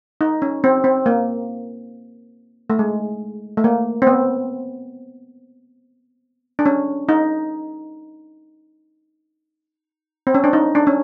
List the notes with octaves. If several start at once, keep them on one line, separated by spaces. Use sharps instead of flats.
D#4
C#4
C4
C4
A#3
A3
G#3
A3
A#3
C4
B3
D4
C#4
D#4
C4
C#4
D4
D#4
D4
C#4